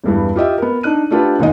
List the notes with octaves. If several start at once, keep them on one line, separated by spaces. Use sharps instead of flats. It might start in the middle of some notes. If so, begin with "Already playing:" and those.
E2 G2 E3
F4 G4 D#5 E5
B3 A#4
D4 D#4 F#6 D#7
A3 D4 F4 G4 A4 B4
E1 D#2 D#3 D#4 D#5